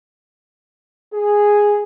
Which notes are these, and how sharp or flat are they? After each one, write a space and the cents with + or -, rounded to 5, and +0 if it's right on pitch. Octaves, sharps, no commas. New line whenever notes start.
G#4 -5